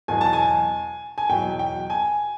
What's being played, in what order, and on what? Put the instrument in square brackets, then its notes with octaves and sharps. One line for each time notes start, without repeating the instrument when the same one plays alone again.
[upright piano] E2 B2 F#3 G#5
A5
G#5
G#5
E2 B2 F#3 G5
G5
G#5